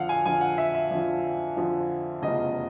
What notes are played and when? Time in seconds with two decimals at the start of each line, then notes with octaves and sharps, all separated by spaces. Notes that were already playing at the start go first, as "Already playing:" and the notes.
Already playing: F2 D3 F3 F5 F#5
0.09 G#5
0.25 F2 D3 F3 G#5
0.41 F#5
0.58 E5
0.75 E5
0.91 F2 D3 F3
1.57 F2 D3 F3
2.22 F1 E2 C#3 F3 D#5